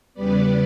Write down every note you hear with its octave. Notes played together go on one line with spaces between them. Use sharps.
E2 C#3 G3 B3 B4 D5